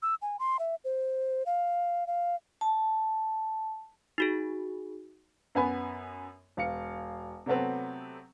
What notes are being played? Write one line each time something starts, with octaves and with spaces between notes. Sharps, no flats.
E6
G#5
C6
E5
C5
F5
F5
A5
D#4 F#4 G#4
F#2 B3 G#5 B5
E1 F5 C#7
C3 F#3 A3 B3 C4